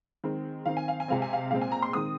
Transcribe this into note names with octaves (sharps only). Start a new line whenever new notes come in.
D#3 G#3 C4
D#3 C4 F5
G#5
F5
G#5
C3 G#3 C4 F5
G#5
F5
A#2 G#3 C4 F5
G#5
A#5
C6
D#3 G#3 C4 D#6